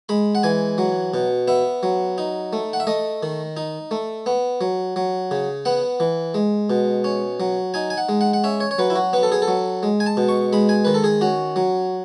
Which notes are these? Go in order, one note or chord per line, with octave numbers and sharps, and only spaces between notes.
G#3 B5
F#5
E3 G#5
F#3
B2
B3 E5
F#3
D#4
A3
F#5
E5
A3 D#5
D#3
D#4
A3
B3
F#3
F#3
C#3
B3 F#5
E3
G#3
B2
C#4
F#3
D#4 G#5
G#5
F#5
G#3
F#5
F#5
C#4 E5
C#5
C#5
F#3 B4
E4
F#4
B3 B4
A4
G#4
A4
F#3
G#3
G#5
A5
B2
C#6
G#3 B5
G#5
D#3 B4
A4
G#4
C#4 F#4
F#3